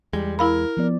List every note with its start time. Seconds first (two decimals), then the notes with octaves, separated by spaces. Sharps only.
0.13 E2 G3 G#3
0.39 E4 A#4 F5 B5
0.77 F3 B3 D5